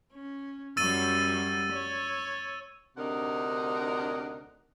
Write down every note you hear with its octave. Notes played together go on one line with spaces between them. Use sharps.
C#4
F#2 F#3 G3 E6 A6 D#7
C#5
D2 C3 D4 D#4 A#4 F#5